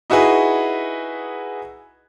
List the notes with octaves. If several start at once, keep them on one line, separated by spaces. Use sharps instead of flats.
D#4 E4 F#4 G#4 B4